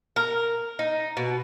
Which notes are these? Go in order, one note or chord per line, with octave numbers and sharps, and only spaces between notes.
A#4
D#4
B2